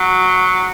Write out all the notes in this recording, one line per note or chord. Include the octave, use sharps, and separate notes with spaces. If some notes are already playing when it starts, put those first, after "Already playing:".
Already playing: F#3